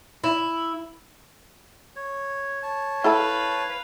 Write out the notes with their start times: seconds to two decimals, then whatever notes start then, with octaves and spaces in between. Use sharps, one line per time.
0.24 E4
1.96 C#5
2.63 C#5 A5
3.04 E4 A4 B4 F5 B5